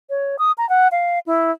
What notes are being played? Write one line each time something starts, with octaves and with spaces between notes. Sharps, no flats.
C#5
D#6
A#5
F#5
F5
E4